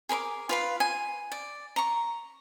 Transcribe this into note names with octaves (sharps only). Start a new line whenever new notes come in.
G#4 A#4 B5 D6
F4 B4 F5
G#5
D5
A#5 C#6